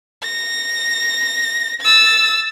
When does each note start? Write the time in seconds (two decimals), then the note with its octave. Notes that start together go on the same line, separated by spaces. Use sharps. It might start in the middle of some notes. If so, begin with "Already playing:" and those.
0.23 A#6
1.81 E6 A6